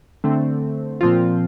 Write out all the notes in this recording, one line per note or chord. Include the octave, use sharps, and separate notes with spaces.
D3 A3 C4
A#2 F3 C4 F4